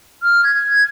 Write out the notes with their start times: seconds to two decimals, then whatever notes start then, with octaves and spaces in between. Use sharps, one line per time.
0.22 F6
0.43 G#6